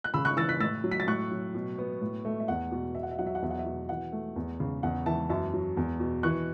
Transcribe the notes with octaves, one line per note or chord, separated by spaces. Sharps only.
F#6
C#3 B5 E6
C#6 F#6
E3 E6 A6
F#6 B6
A2 E6 A6
F#3
B6
A6
A2 C#6 F#6
F#3
B2
B3
A2
A3
E5
E2 F#5
B2
B2 E5
F#5
E5
F#3 F#5
E5
F#5
E2 E5
F#5
E5
B2
E3 F#5
A3
E2
C#3
E2 F#5
E3 E5 A5
F#2 E5 A5
F#3
E2
B2
E3 C#6 F#6